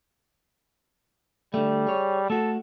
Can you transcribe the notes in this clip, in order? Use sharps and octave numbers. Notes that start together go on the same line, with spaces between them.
D3 G3 A3
G#4 C#5
A3 F#4 A4